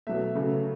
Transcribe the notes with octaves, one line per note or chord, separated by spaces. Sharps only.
B2 F#3 A3 E5
C#3 F#3 A3